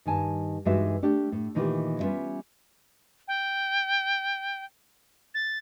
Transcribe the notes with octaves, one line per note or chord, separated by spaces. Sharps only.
G2 D#3 G#5 A5
G2 E3 G#3 D#4 F#4 E5
A3 D4 G4
A2
A#2 D#3 E3 E4 F4 G4
G3 B3 C#4 F4 E5
G5
A6